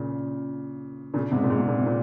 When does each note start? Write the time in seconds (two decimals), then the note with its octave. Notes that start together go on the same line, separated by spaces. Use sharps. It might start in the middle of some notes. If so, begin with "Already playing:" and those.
Already playing: A#2 C#3
1.14 A#2 C#3
1.32 G#2 C3
1.43 A#2
1.50 G#2
1.59 C3
1.68 A#2
1.81 C3
1.86 A#2